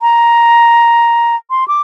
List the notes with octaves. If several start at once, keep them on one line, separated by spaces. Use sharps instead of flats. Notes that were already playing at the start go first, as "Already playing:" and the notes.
A#5
C6
D6